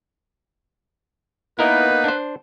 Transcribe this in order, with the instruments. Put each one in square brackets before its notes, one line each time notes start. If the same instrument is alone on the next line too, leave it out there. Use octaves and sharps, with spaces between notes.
[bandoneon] A#3 B3 D#4 [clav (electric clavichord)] E4 A#4 D#5 [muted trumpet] B4
[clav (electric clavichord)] D4 C5